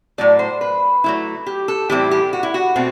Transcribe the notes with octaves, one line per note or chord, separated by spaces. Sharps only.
A2 F#3 A3 D5
C5
B4
F#3 A3 E4
G4
A4
A2 E3 G3 C4 E4 G4
G4
F#4
E4
F#4
B2 A3 C4